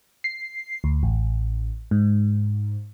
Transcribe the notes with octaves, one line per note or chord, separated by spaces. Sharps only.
C7
D2
A1
G#2